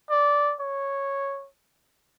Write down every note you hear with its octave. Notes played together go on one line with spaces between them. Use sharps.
D5
C#5